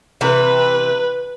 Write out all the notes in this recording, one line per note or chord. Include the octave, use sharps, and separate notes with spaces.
C3 E3 B4